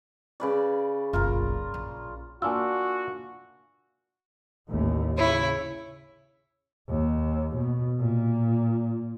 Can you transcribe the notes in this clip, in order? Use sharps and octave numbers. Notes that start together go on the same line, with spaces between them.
C#3 B4 D5
F#1 B1 F4 A#4
A#1
A#3 D4 F4 F#4 G#5 E6
A1 D#2 A3
C#3 E4 C#5
D#2
B2
A#2